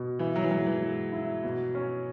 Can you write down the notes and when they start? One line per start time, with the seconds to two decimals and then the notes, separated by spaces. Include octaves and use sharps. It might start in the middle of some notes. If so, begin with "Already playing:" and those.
Already playing: B2
0.19 E3 E4
0.36 F#3
0.44 E3
0.51 F#3 G#3
0.66 E3
0.82 G#3
1.12 E4
1.44 B2
1.75 C#4